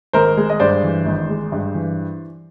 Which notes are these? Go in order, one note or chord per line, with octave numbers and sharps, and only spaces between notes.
G#1 A#4 C5
G#3
D#5
G2 C5 D5
E3
G#1
G#3
G2
E3